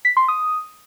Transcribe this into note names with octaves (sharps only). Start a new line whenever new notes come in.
B6
C6
D#6